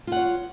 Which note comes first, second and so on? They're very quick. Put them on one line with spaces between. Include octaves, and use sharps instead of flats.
F4 F#5 C#5